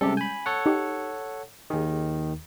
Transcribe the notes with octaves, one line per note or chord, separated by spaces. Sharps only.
C3 G3 G#3 C#4 G4 A4
G#5 B5 G6
A4 C#5 F#5
D#4 G4
D#2 D#3 G#4